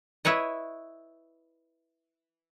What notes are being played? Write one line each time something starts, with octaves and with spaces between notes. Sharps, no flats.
E4 B4 C#5 D#5